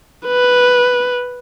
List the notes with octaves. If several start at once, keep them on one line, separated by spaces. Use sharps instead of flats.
B4